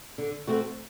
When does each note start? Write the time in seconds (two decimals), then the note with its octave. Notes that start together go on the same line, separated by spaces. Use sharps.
0.18 D3
0.47 A3 C4 F#4